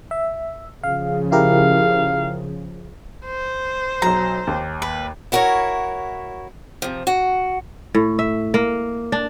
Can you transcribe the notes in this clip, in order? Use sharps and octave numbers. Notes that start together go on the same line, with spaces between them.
E5
C#3 F3 F5
E4 G4 A#4 F5
C5
B1 F#3 A#5
D#2
B4
E4 F#4 A#4 B4 C#5
C3 F3
F#4
A2
E5
A#3
D4